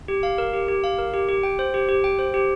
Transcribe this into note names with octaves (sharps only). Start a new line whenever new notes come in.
G4
F5
A#4
G4
G4
F5
A#4
G4
G4
G5
C5
G4
G4
G5
C5
G4